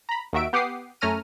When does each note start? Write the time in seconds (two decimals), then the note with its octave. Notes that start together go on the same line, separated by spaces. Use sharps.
0.09 A#5 B5
0.33 D#2 D#3 F#4 E5 D7
0.53 B3 G4 F#5 D6 D#6 C7
1.01 F#2 A3 C#4 A#5 F6 D#7